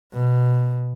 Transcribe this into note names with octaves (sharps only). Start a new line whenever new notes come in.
B2